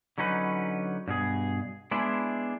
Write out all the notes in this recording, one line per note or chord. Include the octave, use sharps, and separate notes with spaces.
D3 F#3 C#4 D#4 B4
G2 B2 G#4
G#3 B3 D4 E4 G#4